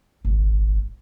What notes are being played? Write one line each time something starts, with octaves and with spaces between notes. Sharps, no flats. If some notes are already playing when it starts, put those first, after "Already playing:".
D#1 G#1